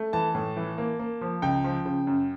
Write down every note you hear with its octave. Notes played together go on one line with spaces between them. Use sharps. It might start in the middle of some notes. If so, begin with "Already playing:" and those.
Already playing: A3
E3 A5
A2
E3
A#3
A#3
F3
C#2 G5
F3
C#3
F#2